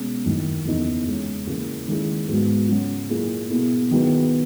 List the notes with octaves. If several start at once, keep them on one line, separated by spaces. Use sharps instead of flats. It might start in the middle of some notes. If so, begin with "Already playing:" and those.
Already playing: B2 G#3 C#4
F#2 D#3 A#3 E4
E2 C#3 E3 A#3 D#4
C#3 G#3 C#4
C#3 E3 A#3
D#3 G#3 C#4 E4 G#4
G#2 F#3 B3 F#4
C#3 F#3 C#4 F#4
A#2 A#3 E4 G#4
B2 A#3 E4 G#4
D#3 F#3 B3 E4 G#4